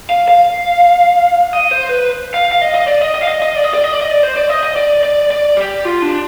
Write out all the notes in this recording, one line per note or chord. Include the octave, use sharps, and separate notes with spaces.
F5
F5
D#5
C5
B4
F5
F5
D#5
D#5
D5
D#5
D#5
F5
D#5
D#5
D5
D#5
D5
D#5
D5
D#5
D5
C5
D5
D#5
D#5
D5
D5
D5
G4
F4
D4